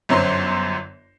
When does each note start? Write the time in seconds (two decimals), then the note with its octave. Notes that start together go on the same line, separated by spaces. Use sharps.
0.09 G1 F#2 F#3 C5 C6